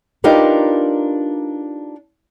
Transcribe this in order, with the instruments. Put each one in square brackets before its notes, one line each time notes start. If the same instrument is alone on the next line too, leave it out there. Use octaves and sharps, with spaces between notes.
[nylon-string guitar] D4 D#4 F4 G4 A#4 B4